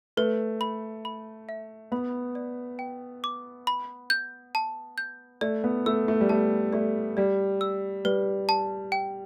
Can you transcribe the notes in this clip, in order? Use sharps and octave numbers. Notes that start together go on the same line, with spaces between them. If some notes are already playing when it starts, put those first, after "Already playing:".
A3 B4
B5
B5
E5
B3 B5
D5
G5
D6
B5
G6
A5
G6
A3 D5
B3
A3 E6
A3
G3
A3 A5
A3 D5
G3 D5
E6
G3 B4
A5
G5